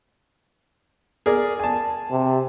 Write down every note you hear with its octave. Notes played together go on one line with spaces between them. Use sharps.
G#4 A#4 D5
G#5 A5
C3